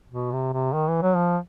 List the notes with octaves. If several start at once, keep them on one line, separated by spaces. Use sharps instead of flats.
B2
C3
C3
D#3
E3
F#3
F3